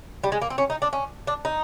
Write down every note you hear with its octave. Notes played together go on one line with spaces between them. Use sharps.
G3
G#3
A#3
C4
C#4
D#4
D4
C#4
D4
D#4